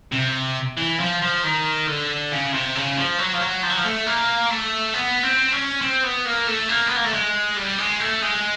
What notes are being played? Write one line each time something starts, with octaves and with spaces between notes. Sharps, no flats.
C3
E3
F3
F3
D#3
D3
C#3
C3
C#3
F3
F#3
F3
F#3
F3
F#3
F3
A3
A#3
A3
B3
C4
C#4
C4
B3
A#3
A3
A#3
B3
A#3
A3
G#3
G3
G#3
A3
G#3